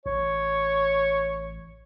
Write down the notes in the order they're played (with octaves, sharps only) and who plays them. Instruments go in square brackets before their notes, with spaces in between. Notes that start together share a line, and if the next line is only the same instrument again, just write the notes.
[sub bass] A1 [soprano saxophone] C#5